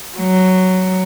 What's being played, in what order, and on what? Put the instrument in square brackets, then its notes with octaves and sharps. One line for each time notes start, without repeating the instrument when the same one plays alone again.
[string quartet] F#3